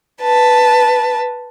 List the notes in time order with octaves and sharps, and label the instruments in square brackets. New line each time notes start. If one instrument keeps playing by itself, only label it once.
[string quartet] B4 A5